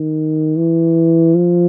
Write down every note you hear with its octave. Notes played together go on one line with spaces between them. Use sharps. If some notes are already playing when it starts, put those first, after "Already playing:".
Already playing: D#3
E3
F3